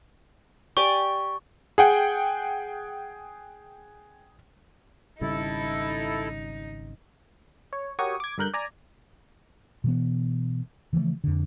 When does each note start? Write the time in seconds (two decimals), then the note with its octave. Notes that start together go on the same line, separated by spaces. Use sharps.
0.77 G4 D5 G#5 C#6
1.78 G#4 F#5 G5
5.21 G#1 C#3 G3 D#4 E4 A4
7.73 C#5
7.99 F#4 G4 A#4 C#5 C#6 D#6
8.20 D6 G#6
8.38 G2 D3 A#4 F#6 G6
8.54 D5 G#5 A#5
9.84 B2 E3 B3
10.93 C#3 E3 F3 A3
11.24 F2 D3